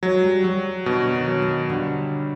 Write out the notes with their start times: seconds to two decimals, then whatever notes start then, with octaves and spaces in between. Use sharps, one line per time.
0.03 F#3 G#3
0.24 G3
0.44 F#3 G3
0.86 B2 D3
1.15 D#3
1.28 F#3
1.42 D#3
1.70 D3 G3